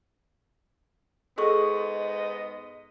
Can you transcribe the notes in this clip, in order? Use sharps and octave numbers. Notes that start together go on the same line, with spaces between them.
G#2 B3 G#4 A4 D#5 C#6